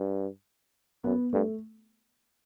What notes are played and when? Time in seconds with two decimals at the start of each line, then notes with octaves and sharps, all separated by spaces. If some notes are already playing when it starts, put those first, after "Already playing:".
Already playing: G2
1.04 F#2 B3
1.33 G2 A3